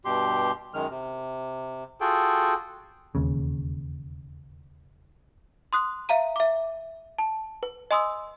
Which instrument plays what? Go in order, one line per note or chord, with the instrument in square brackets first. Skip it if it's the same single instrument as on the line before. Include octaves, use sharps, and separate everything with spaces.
[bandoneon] G2 B2 G4 C6
F#2 D#3 G#3 F6
C3
F4 F#4 G#4 A4 G5
[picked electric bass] E1 D#2 C#3
[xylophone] C6 D#6 F#6
E5 F5 A#5 D#7
E5 D6
A5
B4
D#5 G#5 C6 D#6 E6